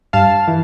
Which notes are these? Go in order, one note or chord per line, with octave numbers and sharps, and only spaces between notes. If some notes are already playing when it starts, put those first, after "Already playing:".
G2 F5 A5
E3